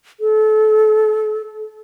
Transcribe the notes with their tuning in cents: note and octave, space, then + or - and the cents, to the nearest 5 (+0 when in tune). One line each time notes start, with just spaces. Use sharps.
A4 -30